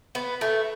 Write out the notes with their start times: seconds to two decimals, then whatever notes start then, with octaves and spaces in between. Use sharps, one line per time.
0.15 B3
0.41 A3